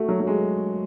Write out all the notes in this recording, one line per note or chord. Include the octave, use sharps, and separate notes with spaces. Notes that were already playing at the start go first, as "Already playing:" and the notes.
Already playing: A3 F#4
F#3
F#3
G#3